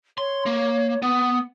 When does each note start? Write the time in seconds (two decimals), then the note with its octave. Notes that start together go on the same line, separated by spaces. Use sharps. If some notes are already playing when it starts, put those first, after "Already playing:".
0.18 C#5 C6
0.46 A#3
1.02 B3 D#6